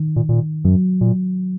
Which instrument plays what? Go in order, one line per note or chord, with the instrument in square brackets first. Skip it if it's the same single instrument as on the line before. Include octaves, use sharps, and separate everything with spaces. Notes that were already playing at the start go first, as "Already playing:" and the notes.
Already playing: [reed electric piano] D#3
[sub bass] A#2
A#2
[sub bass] F#2 [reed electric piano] F#3
[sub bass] A#2